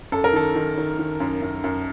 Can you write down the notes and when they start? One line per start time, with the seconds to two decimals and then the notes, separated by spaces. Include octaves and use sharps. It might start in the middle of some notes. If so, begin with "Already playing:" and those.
0.12 F#2 A4
0.24 A#4
0.33 D#3 A4
0.55 D#3
0.77 D#3
0.99 D#3
1.20 F#2
1.42 F#2
1.64 F#2